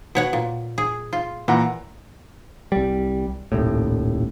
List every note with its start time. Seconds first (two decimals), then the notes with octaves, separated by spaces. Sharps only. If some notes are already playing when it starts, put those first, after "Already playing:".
0.15 B2 C#5 F#5
0.33 A#2
0.78 G#4
1.13 F4
1.48 A#2 E3 F#5 A#5
2.72 C2 G3
3.52 D#1 C2 A2